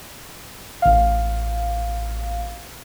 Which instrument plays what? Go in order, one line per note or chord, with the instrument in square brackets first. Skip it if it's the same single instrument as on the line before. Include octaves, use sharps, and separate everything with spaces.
[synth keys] A1 F5